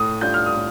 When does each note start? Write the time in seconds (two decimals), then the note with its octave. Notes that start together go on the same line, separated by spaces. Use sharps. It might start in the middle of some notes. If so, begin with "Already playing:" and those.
Already playing: A2 D#6
0.21 G3 D4 F4 G6
0.34 F6
0.46 D#6
0.55 A2